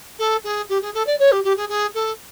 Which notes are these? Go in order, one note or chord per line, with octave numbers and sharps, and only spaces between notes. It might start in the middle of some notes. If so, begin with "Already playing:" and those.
A4
G#4
G4
G#4
A4
D5
C#5
G4
G4
G#4
G#4
A4